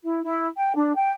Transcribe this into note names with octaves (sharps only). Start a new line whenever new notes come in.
E4
E4
G5
D4
G5